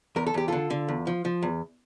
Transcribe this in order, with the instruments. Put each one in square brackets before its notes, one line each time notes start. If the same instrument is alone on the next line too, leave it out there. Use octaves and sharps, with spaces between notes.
[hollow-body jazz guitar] E2 A#4
A4
E2 G4
D3 F4 A4
D3
E2
F3
F3
E2